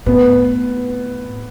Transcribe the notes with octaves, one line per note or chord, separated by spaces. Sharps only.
A2 B3